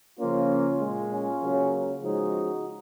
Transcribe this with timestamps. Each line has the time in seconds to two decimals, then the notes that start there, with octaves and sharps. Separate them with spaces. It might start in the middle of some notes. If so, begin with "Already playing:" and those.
0.20 C#3 F3 A#3 C#4 F4
0.81 A#2 G#3
1.11 C#4 F4
1.42 C#3 F#3 A#3
2.02 C#3 F3 G#3 D#4 F#4